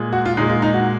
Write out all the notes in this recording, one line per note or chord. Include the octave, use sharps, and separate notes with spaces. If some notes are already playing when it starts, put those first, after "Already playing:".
Already playing: A#2 G#3
F#4
F4
A#2 G#3 D#4
F4
D#4
F#4